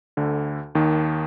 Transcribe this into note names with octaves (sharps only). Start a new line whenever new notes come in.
D2 D3
D#2 D#3